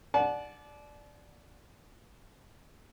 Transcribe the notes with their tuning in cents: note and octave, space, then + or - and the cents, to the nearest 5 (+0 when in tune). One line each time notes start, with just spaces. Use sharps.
D5 +0 F#5 -10 A5 -40